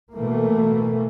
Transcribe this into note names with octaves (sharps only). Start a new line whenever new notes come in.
B2 E3 A3 A#3